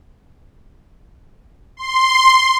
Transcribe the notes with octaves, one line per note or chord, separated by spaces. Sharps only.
C6